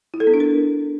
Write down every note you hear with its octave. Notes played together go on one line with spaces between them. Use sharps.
E4
A4
B3
D4
A#4